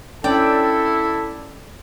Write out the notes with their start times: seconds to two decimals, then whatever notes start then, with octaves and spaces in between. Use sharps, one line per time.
0.24 C#4 D4 E4 A4 D5 G5